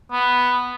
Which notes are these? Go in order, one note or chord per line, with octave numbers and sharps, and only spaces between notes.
B3